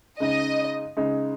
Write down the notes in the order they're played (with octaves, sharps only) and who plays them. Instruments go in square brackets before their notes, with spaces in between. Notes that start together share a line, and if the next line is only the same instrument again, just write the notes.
[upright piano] C#3 G#3 D#4 [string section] D#5
[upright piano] C#3 G#3 D#4